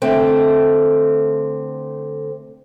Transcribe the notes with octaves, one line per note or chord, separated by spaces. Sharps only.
D3 A3 C4